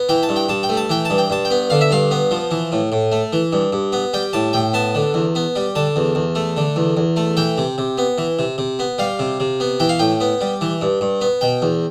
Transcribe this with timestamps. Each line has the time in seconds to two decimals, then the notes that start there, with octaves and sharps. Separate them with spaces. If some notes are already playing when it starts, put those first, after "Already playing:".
Already playing: B3
0.09 E3 G5
0.23 A5
0.29 G2
0.36 G5
0.49 G2 A5
0.63 G5
0.69 A3
0.77 A5
0.89 E3 G5
1.05 A5
1.10 G2
1.18 G5
1.30 G2 A5
1.45 G5
1.50 B3
1.70 D3 F5
1.81 E5
1.91 G2 F5
2.11 B3
2.31 F3
2.51 E3
2.72 A2
2.92 A2
3.12 A3
3.33 E3
3.53 G2
3.73 G2
3.92 B3
4.13 G3 G5
4.33 A2 A5
4.53 A2 G5
4.73 B3 A5
4.95 D3
5.14 E2
5.35 B3
5.56 G3
5.75 D3 A5
5.96 E2
6.15 E2
6.35 A3
6.57 D3
6.76 E2
6.97 E2
7.16 A3
7.37 E3 G5
7.58 C3
7.78 C3
7.98 B3
8.18 E3
8.39 C3
8.58 C3
8.79 B3
8.98 G3 F5
9.19 C3
9.40 C3
9.60 B3
9.80 E3 G5
9.89 F5
9.99 A2 G5
10.20 B3
10.41 G3
10.61 E3
10.81 G2
11.01 G2
11.21 B3
11.41 B2 G5
11.62 E2